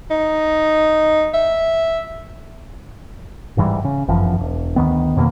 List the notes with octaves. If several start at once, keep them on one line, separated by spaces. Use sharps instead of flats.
D#4
E5
D1 G#2 E3 G3
C#3
G1 F#2 E3 F3
E1
D2 D#3 B3
F2 B2 D#3 A#3